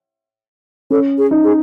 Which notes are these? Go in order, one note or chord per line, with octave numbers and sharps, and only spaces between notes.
C#4 A4
G#4
D#4
G#4